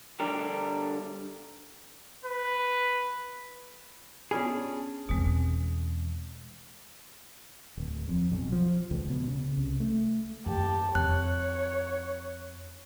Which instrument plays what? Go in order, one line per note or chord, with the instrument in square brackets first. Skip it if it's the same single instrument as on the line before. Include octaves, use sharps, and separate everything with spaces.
[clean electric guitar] D3 G3 D4 G4 A#4
[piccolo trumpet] B4
[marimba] B3 F4 [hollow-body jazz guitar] C#4 D4 G#4
[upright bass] E2 C4 [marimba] B2 G#3
[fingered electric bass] D1
F2
B1
F3
C#2
B2
C#3
C2
A3
[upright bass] F#2 A#3 [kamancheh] G4 A5
[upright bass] F2 [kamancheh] C#5 [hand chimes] F#6